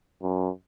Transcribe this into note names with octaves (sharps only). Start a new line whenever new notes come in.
F#2